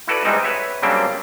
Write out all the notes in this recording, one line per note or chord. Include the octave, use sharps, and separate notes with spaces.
E4 F#4 A4 B4 D5
G#2 E3 G3 C4 D#4
B4 C#5 E5
C#3 F#3 G3 A#3 C4 D4